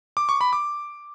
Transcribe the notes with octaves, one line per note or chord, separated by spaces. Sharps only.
D6
C#6
B5
D6